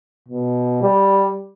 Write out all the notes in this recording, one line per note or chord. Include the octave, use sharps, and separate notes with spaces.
B2
G3